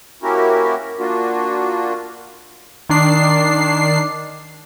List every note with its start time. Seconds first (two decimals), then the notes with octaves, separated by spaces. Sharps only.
0.22 A#3 C#4 E4 F#4 G4 A#4
0.99 A#3 D4 F4 F#4
2.89 D#3 D4 C7